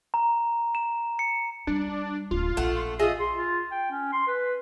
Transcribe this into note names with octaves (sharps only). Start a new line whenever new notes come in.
A#5
E7
C#7
G3 D4
D1 F4
A#1 A3 F#5
F4 G#4 D#5 E5
C6
F4
G5
C#4
C6
B4